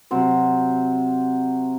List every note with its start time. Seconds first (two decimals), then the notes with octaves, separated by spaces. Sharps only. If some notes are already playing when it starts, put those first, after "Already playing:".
0.11 C3 F#3 C5